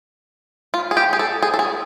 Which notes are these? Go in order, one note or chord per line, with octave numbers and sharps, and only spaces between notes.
F4
G#4
G4
G#4
A4
G#4
A4
G#4